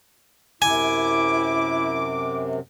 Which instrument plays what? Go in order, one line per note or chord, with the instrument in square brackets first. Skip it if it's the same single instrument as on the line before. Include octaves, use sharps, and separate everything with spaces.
[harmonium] F#2 C3 [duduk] E4 [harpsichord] G#5 [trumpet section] D6